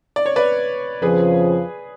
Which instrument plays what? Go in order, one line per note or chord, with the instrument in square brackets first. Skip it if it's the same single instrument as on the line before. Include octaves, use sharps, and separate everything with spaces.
[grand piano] D5
C#5
B4 D5
[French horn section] F2 C#3 F3 [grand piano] G#4 B4